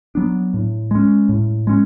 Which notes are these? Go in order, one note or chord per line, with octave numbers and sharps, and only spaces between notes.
F#3 B3 D4
A2
G#3 C#4
A2
G#3 C#4